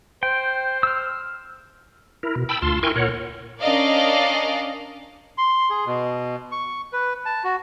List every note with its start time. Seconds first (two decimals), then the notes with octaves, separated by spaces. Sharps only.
0.23 C5 G5
0.83 E6 F6
2.23 E4 A#4
2.36 B2
2.49 G5 A5 B5 E6
2.62 D2 F4 A5 C6
2.83 E4 A#4 G5 G#5 C6 C#6
2.96 A#2 A#4 C#5 F#5
3.60 C#4 D4 A#4 D5 D#5 F5
5.38 C6
5.70 G#4
5.86 B2
6.52 C#6
6.93 B4
7.26 A5
7.44 F#4